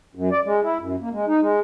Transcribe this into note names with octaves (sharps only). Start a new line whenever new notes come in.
F#2
D5
G#3
E4
F#2
A#3
G#3
D#4
G#3